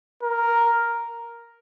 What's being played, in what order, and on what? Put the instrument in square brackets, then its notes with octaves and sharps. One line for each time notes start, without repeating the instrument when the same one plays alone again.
[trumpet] A#4